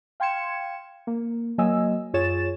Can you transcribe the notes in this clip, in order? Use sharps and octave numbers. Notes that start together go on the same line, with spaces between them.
F5 G5 C6 G#6 C#7 E7
A#3
F#3 A#3 D#5 G#5 E6
F#2 F4 G#4 C#5 A6 E7